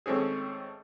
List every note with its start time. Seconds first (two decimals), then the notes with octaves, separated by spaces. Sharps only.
0.06 G#1 A3 C4 C#4 G#4